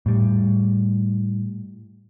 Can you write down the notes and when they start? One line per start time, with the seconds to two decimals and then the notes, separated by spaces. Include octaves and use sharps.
0.06 A2 G3